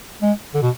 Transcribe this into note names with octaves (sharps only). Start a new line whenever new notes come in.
G#3
D3
B2